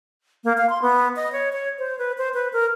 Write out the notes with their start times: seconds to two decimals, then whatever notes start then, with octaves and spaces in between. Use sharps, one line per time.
0.44 A#3
0.58 F5
0.70 C6
0.82 B3
1.16 D#5
1.32 C#5
1.52 C#5
1.79 C5
1.99 B4
2.18 C5
2.34 B4
2.53 A#4